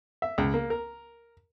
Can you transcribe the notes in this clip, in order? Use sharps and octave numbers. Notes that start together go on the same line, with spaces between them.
E5
C#2
A#3
A#4